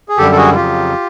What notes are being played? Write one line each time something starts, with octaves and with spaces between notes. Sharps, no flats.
G#4
F#2 D3 G3 G4 A4
A4
F#4 G#4
F2 C#3 F#3 F4 G4